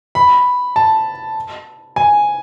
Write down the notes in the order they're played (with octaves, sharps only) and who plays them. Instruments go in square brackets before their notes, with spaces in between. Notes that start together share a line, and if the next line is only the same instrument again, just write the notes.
[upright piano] B5
A5
G#5